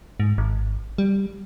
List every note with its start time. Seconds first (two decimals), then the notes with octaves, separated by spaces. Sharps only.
0.20 G#2
0.38 G#1
0.98 G3